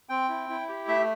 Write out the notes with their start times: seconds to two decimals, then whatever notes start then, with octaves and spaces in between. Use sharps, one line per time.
0.09 C4 G5
0.29 E4
0.50 E4
0.69 G4
0.88 A3 E5